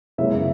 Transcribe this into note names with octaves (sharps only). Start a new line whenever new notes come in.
F#2 C#3 G#3 B3 E4 E5